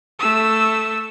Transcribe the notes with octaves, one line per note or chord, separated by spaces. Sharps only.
A3 E6